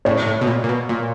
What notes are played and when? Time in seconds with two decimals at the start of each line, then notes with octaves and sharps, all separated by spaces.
0.05 A2 C#5
0.27 A2
0.41 B2
0.47 A#2
0.64 A#2
0.69 B2
0.89 A#2